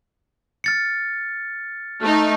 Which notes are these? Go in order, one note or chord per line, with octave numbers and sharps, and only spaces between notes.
F6 A6 C#7
A3 D#4 F6